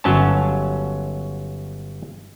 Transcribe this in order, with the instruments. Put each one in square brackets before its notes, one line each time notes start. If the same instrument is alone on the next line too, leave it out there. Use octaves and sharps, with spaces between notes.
[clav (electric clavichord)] G1 F#3 C#4 A5